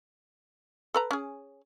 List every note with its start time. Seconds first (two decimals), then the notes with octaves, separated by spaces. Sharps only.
0.94 A4 B4 A#5
1.11 C#4 G#4